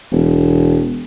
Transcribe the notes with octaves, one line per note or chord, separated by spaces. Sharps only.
E1